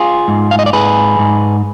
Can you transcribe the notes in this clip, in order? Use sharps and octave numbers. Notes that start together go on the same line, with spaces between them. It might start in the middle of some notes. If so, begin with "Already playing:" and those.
Already playing: F4 G#4
G#2
F5
D#5
D5
G#2 G#4 B4
G#2